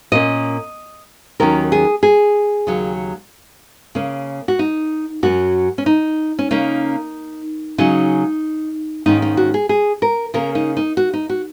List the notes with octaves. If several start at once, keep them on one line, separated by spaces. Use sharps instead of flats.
A#2 A#3 C#4 D#5
D#2 D#3 F#3 C#4 A#4
G#4
G#4
D#2 C#3 F#3
C#3 A#3 C#4
F#4
D#4
F#2 F#3 C#4 F#4
C#4
D#4
C#4
C#3 A#3 C#4 D#4
C#3 F#3 C#4 D#4
G#2 D#3 A#3 C#4 D#4
D#4
F#4
G#4
G#4
A#4
C#3 A#3 C#4 A#4
D#4
D#4
F#4
D#4
F#4